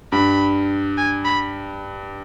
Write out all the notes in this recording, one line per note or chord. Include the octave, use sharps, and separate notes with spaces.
G2 B5
G#5
B5